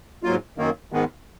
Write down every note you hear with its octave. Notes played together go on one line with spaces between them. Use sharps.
G#2 F#3 A#3 F4
F#2 D#3 A#3
G#2 D#3 G#3 B3